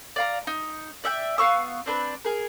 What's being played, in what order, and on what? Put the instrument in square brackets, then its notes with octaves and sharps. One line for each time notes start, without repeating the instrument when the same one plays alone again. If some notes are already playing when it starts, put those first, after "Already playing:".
[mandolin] D5 F5 A#5
D#4
D5 E5 F#5 G5
B3 F5 C#6 E6
C4 D4 B4
G#4 A#4